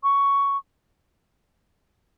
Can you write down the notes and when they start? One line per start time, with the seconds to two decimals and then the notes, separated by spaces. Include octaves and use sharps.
0.03 C#6